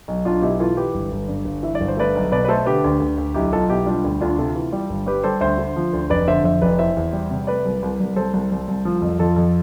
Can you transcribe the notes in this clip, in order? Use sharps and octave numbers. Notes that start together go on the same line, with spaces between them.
B1
B1 D4 F4
B2 E4 G4
E3 F4 A4
E3 G4 B4
G1
G1
G2
G1
E3 E5
D5
G1
C5
A3 B4 D5
B1
B2 B4 D5
B4
A3 A4 C5
D3 G4 B4
D2
D2
D2
B1 E4 G4
B1 F4 A4
B2 E4 G4
G3 D4 F4
D2
D2 D4 F4
C3 F4 A4
E3
G3
G1
G3 G4 B4
G3 A4 C5
D2 C5 E5
D3
F3
D2
F1 B4 D5
D3 C5 E5
F2 C5 E5
F1 B4 D5
E3 C5 E5
E2
G3
C3
A3 B4 D5
C2
C2
C2
C2 A4 C5
C2
C2
C2
F3
F2
F2 F4 A4
F2